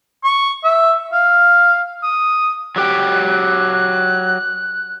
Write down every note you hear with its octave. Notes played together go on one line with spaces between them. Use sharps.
C#6
E5
F5
D#6
F#3 G4 G5 F#6